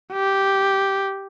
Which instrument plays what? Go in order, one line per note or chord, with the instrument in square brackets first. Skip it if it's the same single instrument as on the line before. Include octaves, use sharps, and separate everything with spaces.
[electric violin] G4